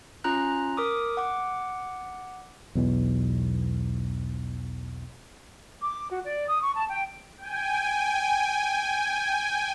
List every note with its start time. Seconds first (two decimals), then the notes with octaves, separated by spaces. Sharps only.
0.24 C#4 F4 A#5 F#6
0.77 A#4 D6 D#6
1.17 F#5 D6
2.75 B1 E2 B2
5.82 D6
6.10 F#4
6.24 D5
6.48 D#6
6.62 C#6
6.75 A5
6.88 G5
7.38 G5 G#5